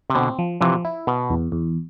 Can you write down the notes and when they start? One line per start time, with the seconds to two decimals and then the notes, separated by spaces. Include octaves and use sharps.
0.10 C3
0.15 B2 D3 C4
0.39 F3
0.61 C3 E3 F3
0.85 E4
1.07 B2 B3
1.30 E2
1.52 E2